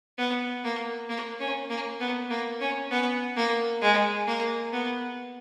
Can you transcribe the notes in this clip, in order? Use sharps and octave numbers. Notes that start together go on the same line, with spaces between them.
B3
A#3
A#3
C#4
A#3
B3
A#3
C#4
B3
A#3
G#3
A#3
B3